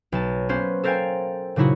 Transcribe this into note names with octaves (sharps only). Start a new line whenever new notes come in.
B1 A5
A#3 B3 C#4 B4 C5
A4 A#4 C5 F5 G5 G#5
A#2 C#3 F#3 D#4 E4 F#4